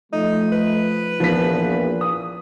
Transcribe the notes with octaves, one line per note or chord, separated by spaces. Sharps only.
F3 A3 D#4
B4
A#1 E2 A#2 F3 B3 B6
D#6